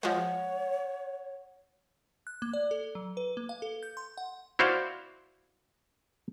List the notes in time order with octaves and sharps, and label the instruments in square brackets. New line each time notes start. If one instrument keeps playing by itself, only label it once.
[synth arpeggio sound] F3 G#3 [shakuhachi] C#5 [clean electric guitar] F#5
[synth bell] F#6
A#3
D5
A4
F#3
B4
A#3
F5
A4
G6
C6
F#5
[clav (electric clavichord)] E4 F#4 C5 D5 F5